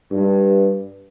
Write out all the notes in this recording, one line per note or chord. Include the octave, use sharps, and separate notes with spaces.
G2